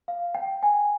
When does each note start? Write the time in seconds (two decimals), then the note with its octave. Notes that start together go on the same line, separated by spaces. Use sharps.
0.08 F5
0.35 G5
0.63 G#5